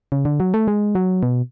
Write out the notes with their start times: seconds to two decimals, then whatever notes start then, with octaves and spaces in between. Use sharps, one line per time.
0.12 C#3
0.25 D3
0.40 F#3
0.54 A3
0.68 G#3
0.95 F#3
1.23 B2